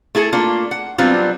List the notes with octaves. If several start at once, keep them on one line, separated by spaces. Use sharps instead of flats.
A3 E4 G#4 A4
A3 A#3 D4 F4
F#5
F#3 G3 B3 C4 D4 F4